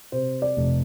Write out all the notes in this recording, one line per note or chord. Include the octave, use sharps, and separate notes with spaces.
C3 C5
D5
F1